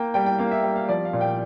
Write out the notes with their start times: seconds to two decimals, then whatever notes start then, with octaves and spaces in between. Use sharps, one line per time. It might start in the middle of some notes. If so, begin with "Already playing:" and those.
Already playing: A#3 G5
0.14 G3 G5
0.26 G5
0.38 A#3 F5
0.51 E5
0.63 G3
0.76 F5
0.89 F3 D5
1.05 F5
1.13 A#2
1.21 G5